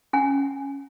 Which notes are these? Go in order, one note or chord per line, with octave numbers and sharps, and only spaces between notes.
C#4 F#5 G#5